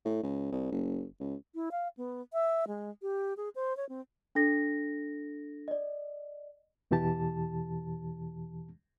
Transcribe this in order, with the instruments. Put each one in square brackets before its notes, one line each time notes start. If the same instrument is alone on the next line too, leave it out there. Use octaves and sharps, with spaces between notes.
[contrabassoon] A2
C#2
C2
F#1
C#2
[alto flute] E4
F5
B3
E5
G#3
G4
G#4
C5
C#5
C4
[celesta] D4 A4 A#6
D5 D#5
[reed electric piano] E2 B2 E3 G4 A5